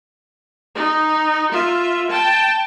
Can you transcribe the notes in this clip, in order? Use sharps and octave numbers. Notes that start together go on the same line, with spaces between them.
D#4
F4 E5
G5 A5